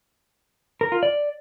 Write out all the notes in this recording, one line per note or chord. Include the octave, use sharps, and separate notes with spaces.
A#4
F4
D5